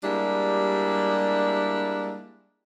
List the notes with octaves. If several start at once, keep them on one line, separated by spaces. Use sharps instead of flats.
G3 G#3 A#3 D4 E4 G4